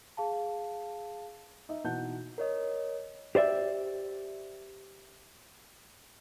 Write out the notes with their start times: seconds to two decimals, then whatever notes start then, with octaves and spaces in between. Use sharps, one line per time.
0.17 G#4 F5 A5
1.69 D#4 D#5 E5
1.84 B2 E3 D#4 F#5 A5 G6
2.38 A#4 C#5 D#5
3.35 G4 C5 D5 E5